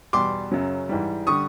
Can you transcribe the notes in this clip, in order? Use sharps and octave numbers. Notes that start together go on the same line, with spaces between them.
E2 B2 G3 C6 D6
F#2 C#3 F#3
G#2 E3 G3
D3 G3 C#6 D#6